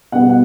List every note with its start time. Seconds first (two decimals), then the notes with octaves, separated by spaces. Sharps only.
0.12 B2 G3 B3 F#5
0.30 F#5